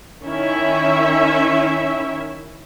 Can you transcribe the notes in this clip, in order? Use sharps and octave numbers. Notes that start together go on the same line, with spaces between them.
D#3 C#4 E4 E5